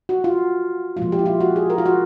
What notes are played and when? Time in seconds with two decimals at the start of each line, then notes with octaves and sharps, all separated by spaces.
0.09 F#4
0.24 F4
0.97 A#2 F3 G#3 F4
1.12 G4
1.19 E4
1.26 F4
1.40 F#4
1.56 G#4
1.70 A#4
1.78 F4
1.86 F#4